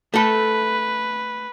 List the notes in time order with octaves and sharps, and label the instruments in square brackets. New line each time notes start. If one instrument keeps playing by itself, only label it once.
[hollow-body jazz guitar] A3 A4 [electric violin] B4